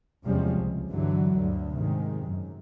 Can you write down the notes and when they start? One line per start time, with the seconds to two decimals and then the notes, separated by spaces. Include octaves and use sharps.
0.25 E2 C3 F3 G3 G#3 C#4
0.58 C#2
0.89 G2 D3 E3 F#3
1.35 D2 G2 D3
1.74 G#2 C3 D#3 G#3
2.21 F#2